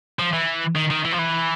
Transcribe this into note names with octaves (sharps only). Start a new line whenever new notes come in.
F3
E3
D#3
D#3
E3
F3
E3